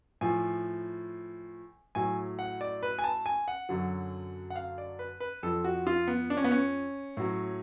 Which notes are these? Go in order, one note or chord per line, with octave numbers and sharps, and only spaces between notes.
A2 F3 G#5
A2 F#3 G#5
F#5
D5
B4
G#5
A5
G#5
F#5
F#2 D3 F#3
F#5
F5
D5
B4
B4
F2 F3 A4
F#4
F4
B3
D4
C#4
B3
C#4
A2 F#3